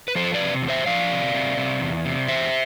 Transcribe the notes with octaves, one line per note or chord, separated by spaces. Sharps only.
B4
F3 A4 C5
B4 D5
C3
E2
C5 E5
F3 D5 F5
C3
C3
C3
E2
C3
E2 C5 E5